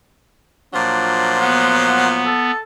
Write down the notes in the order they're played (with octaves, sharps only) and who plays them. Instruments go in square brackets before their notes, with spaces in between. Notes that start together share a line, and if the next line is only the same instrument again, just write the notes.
[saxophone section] A#2 F3 F#3 [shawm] D4
[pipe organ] B3 [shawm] F#5
[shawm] A4